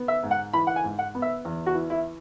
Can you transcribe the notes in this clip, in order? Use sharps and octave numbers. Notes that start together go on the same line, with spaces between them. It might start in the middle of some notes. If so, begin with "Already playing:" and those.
Already playing: B3
E5
G#2
F#5
E3 B5
F#5
G#5
G#2
F#5
B3
E5
E2
F#4
E3
E4